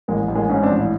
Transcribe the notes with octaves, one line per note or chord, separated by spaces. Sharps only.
A1 G#3 A#3
A1
G#3 A#3
G#2 C#4
C4 D4
A1
E4